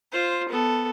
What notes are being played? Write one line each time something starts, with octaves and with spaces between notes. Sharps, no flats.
F4 C5
B3 A4